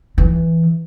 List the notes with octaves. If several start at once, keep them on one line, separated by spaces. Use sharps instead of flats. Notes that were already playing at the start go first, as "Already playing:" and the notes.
E3